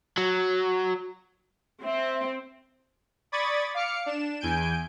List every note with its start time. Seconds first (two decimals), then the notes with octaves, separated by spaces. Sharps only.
0.17 F#3
1.84 C4 E5
3.32 D5 B5 C#6 D#6 G#6 A6
3.74 F5 D6 F6 C#7
4.06 D4 E7
4.40 E2 G#5 G6 D7